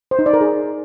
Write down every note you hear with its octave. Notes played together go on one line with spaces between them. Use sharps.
C5
D#4
D5
A#4
G#4